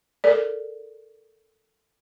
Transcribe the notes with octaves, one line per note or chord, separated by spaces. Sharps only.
A4 A#4 D5